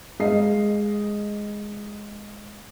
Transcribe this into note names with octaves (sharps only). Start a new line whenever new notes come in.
G#3 D#5 F5 C7